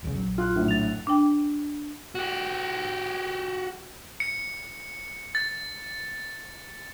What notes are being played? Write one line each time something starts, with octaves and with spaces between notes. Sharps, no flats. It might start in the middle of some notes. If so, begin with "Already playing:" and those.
E1 C2 C#3
A#1 F#3
F4 C6 F#6
F#2 A2 D3
A6 F7
D4 G5
F#4 G4
C#7
A6